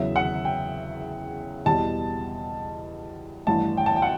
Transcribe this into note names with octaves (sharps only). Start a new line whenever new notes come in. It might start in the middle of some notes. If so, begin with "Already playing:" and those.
Already playing: E2 C#3 F#3 E5
F#5
G5
E2 B2 G3 A5
A1 G2 E3 A5
G5
A5
G5
F#5